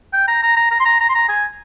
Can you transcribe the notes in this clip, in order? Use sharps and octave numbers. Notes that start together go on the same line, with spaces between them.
G5
A#5
A#5
A#5
A#5
C6
A#5
A#5
C6
A#5
G#5